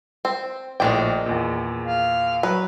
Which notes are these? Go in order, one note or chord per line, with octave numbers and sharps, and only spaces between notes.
C4
A#1 A2 D#3 G#3 D5 G5
E2 A#2
F5
F#3 B4